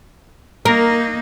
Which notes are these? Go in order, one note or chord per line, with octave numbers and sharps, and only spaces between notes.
A#3 D#4 A#4